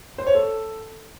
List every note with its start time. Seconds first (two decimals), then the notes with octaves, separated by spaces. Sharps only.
0.18 C5
0.27 C#5
0.35 A4